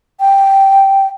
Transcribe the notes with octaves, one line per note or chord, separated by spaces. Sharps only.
G5